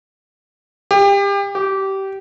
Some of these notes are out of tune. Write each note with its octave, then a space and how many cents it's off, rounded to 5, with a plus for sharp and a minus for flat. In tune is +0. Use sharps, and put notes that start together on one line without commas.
G4 +30
G4 -20